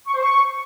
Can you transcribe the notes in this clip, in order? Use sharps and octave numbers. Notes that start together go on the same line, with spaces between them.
C#6
C5
C#6